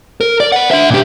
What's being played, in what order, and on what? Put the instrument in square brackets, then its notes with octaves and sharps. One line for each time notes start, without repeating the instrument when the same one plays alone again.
[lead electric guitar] A#4
D5
B4 F#5
D4 E5
A#2 G4